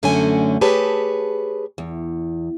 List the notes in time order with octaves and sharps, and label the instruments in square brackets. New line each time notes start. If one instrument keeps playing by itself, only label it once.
[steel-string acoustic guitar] F#2 D3 A3 C#4 F#4 G#5
G4 G#4 B4 C#5 A5
E2